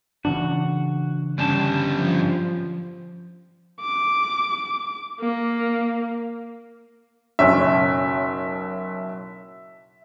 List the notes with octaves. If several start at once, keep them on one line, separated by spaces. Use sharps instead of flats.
C#3 E3 D4 F#4
G2 D3 G3 C#4 A5
F3
D6
A#3
F#1 B1 C#5 E5